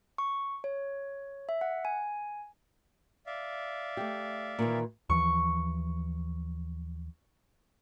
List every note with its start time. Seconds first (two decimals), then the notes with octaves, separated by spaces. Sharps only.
0.18 C#6
0.64 C#5
1.49 E5
1.61 F#5
1.85 G#5
3.27 D5 E5 F5
3.97 A3 G4
4.59 A#2 D#3 E3
5.10 D#2 E3 F3 C#6